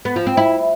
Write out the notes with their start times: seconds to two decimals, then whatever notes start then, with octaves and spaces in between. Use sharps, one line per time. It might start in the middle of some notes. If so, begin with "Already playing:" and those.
0.05 B3
0.16 F3
0.27 C4
0.37 E4